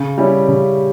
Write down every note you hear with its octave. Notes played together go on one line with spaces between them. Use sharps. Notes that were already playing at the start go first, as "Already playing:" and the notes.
Already playing: C#3
G3 C#4 E4 G4
C#3